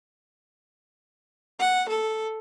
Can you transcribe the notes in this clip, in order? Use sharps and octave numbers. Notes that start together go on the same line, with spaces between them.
F#5
A4